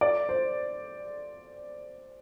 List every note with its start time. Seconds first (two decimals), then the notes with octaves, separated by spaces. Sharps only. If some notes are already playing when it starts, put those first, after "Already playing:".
0.01 D5
0.29 C5